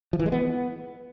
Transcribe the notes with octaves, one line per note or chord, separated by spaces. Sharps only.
F3
E3
G#3
B3